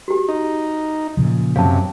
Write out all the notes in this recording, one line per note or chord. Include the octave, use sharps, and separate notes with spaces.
F#4 G4
D#4
A#2 C#3 F3
F#2 C3 F5 A5